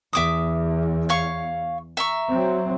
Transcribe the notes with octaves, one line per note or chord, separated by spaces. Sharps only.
E2 E5 D6 D#6
C#5 F5 C#6
E5 A#5 C#6
F#3 C4